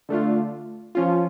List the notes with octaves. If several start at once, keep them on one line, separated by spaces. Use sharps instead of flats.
D3 A3 D4 F4
F3 C#4 F4